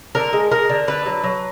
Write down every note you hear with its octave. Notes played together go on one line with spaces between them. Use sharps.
D3 A#4
G#3
G#3 A#4
D3
D3 B4
F#3
F#3